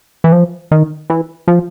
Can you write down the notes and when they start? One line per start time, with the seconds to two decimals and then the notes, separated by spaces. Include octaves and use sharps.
0.24 E3
0.32 F3
0.71 D#3
1.10 E3
1.48 F3